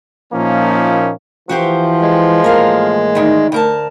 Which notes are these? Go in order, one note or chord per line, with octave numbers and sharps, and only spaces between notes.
A#2 F3 A#3 C#4 D#4 E4
E3 F3 F#4 G4 C5
G#3
A2 E3 A#3 A#4 F5
D2 D#3
D2 A#4 A5